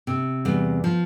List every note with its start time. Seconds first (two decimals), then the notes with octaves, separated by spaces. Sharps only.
0.07 C3
0.45 E2 G3
0.84 F3